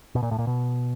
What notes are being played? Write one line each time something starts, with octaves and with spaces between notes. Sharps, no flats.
B2
A#2
A2
A#2
B2